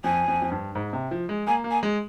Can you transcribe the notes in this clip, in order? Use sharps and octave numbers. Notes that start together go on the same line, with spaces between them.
F2 G#5
F2
F2
G2
G#2
C3
F3
G#3
A#3 G#5
A#3
G#5
G#3